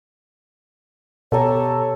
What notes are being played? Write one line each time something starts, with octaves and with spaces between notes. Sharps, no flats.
B2 G4 A4 C#5 G#5 A#5